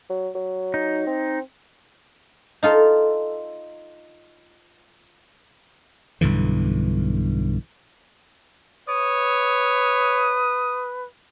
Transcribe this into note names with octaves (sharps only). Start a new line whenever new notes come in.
F#3
F#3
D#4
C4
D#4 F4 A4
B1 G2 D3 E3
B4 C#5 D#6